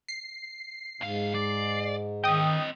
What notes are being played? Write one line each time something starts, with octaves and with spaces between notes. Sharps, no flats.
C7
C#2 G#2 F5
D5
D#3 C4 D#5 G5 D#6